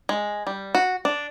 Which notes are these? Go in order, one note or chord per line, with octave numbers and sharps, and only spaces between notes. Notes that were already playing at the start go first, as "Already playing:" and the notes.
G#3
G3
F#4
D4